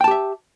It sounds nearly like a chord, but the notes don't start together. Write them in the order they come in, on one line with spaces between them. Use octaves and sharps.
G5 A5 G4 E5